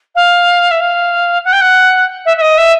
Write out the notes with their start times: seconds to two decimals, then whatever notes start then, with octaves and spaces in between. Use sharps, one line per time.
0.15 F5
0.71 E5
0.80 F5
1.44 F#5
1.52 G5
1.60 F#5
2.25 E5
2.37 E5
2.41 D#5
2.57 E5